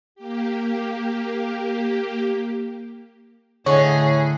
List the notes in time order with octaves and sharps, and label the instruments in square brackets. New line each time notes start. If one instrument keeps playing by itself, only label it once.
[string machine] A#3 G4
[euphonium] A2 [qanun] D3 D#5 F#5 [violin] G#4 [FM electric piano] C#5